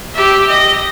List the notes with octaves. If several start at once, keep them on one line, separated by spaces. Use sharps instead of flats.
G4 E5
D#5